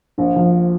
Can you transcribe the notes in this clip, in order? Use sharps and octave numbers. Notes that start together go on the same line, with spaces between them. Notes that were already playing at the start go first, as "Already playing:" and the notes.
A#1
F3